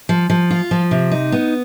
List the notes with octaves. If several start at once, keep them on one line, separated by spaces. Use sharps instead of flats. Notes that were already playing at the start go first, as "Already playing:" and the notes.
F3
F3
F4
F3
C3
D#4
B3